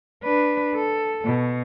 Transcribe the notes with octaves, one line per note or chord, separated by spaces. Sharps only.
D4 B4
A4
B2